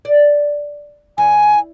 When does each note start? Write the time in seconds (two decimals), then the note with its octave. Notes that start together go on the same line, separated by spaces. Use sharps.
0.05 D5
1.18 E2 G#5